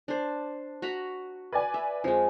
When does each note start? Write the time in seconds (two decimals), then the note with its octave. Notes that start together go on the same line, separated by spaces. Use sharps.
0.08 D4 C5
0.82 F#4 A#5 B5
1.52 B4 D5 G#5
1.74 E5
2.04 F2 F3 G#3